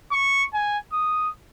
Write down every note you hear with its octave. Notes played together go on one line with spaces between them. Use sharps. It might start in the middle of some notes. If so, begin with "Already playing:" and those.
C#6
G#5
D#6